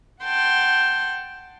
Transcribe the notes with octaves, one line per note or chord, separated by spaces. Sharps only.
F#5 G5 A5 C6